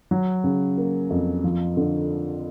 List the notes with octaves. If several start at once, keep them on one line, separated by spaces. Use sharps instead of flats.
F#3
C#3
A#3
F2
F3
D3